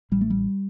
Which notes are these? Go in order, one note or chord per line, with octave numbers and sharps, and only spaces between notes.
A1 G3
A3
G3